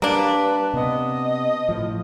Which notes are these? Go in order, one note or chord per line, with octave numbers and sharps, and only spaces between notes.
G3 A#3 D4 B4
C3 B3 D#5
A2 F3